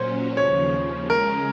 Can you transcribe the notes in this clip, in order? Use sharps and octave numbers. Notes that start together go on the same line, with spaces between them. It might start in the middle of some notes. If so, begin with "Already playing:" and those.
Already playing: A#2 F#3 C#4 C5
D#2 C#3 F3 C#5
C#3 G#3 C#4 A#4